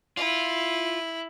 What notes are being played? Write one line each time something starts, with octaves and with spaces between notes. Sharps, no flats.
E4 F4